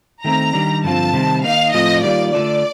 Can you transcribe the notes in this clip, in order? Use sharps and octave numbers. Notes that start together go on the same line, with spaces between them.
D#3 A3 C4 A#5
D#3 G3 D4
G2 D3 F3 C4 F4 A5
C3 D#3 G3 C4
D#3 A#3 D#4 F5
A2 F3 A3 C4 F4 D#5
D#3 G3 A#3 D4 F4 D5
D3 A3 D4 F4 D5